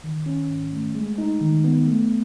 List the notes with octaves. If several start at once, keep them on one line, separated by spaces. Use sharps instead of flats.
D#3
C#4
G#2
A3
G#3
D#4
D#3
B3
A3